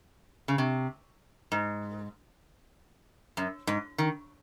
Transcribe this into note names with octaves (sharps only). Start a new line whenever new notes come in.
C#3
C3
G#2
F#2
G#2
D#3